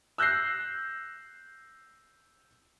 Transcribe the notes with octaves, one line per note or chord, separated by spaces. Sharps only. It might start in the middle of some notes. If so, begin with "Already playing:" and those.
E6 F#6 G6 A#6 C7